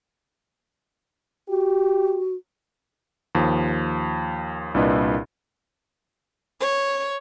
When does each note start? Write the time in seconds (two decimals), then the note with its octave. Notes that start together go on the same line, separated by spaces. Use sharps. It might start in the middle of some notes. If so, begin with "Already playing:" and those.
1.49 F#4 G4
3.35 D#2 F3
4.74 C2 A#2 D4 E4 B4 D#5
6.59 C#5